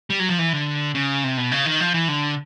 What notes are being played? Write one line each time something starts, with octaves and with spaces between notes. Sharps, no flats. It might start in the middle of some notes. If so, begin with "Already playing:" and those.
G3
F#3
F3
E3
D3
C#3
C3
B2
C#3
D#3
F3
E3
D3